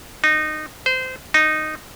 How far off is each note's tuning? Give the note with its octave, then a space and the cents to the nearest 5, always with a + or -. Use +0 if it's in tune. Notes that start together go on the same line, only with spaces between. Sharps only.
D#4 -20
C5 -20
D#4 -10